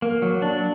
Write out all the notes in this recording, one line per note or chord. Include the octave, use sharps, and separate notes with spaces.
A#3
F#3
D4